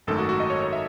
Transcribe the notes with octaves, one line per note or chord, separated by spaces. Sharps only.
G#1 F#2 D#3 A3 A4
F#4
F#4
D#5
C#5
C#5
E5